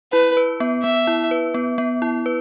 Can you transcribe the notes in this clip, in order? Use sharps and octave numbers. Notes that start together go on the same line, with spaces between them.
E4 B4
B4
B3
B3 E5
E4
B4
B3
B3
E4
B4